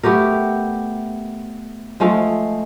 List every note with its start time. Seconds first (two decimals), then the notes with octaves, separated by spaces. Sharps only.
0.03 A3 B3 G4 A#4
2.00 F3 G#3 A3 F5